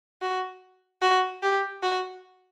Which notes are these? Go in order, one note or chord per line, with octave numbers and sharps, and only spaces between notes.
F#4
F#4
G4
F#4